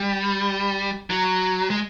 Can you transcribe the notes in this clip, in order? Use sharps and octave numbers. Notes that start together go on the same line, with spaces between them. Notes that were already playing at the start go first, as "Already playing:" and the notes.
Already playing: G3
F#3
G#3